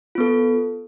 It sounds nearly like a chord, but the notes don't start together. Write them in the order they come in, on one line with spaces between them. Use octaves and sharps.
F4 B3 A4